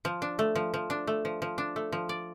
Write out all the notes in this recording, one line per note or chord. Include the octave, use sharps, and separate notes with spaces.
F3
D4
A3
F3
F3
D4
A3
F3
F3
D4
A3
F3
D5